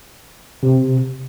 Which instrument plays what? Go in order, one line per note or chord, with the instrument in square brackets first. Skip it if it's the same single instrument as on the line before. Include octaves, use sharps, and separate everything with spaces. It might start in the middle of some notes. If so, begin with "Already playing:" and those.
[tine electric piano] C3